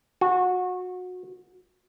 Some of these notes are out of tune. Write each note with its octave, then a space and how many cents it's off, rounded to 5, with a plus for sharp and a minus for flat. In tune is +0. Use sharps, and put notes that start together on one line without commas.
F#4 -25